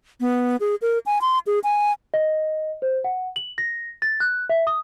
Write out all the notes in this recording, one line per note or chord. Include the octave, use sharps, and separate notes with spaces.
B3
G#4
A#4
G#5
C6
G#4
G#5
D#5
C5
F#5
F#7
A#6
A6
F#6
E5
D#6